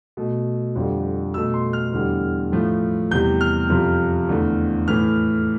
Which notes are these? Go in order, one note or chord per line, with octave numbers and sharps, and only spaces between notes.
B2 A3
F2 D3 G3
B2 A3 E6
C6
F6
E2 D3 G3
A2 F3 A3
E2 C3 G3 G6
F6
F2 C3 F3
E2 D3 A3
A2 E3 A3 F6